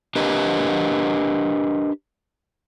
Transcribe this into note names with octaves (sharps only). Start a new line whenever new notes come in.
D4 G4 A#4 B4 D#5